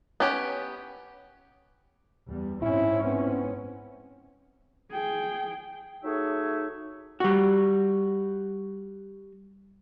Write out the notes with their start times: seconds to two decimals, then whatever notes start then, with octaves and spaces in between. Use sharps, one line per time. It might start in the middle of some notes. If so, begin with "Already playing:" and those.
0.20 B3 C#4 G4 C#5
2.28 E2 G3
2.62 G#2 C4 C#4 E4
3.04 B3
4.92 G#4 G5
6.04 F#3 A3 D#4 G#4 C#5 E5
7.20 G3 F#4